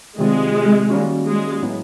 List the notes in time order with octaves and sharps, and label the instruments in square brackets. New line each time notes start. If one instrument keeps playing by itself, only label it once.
[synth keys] C3 D#3 G3 C4 F4 [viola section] G#3
[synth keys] D#3 G3 A#3 C#4 F#4
[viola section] G#3
[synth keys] A2 F#3 B3 E4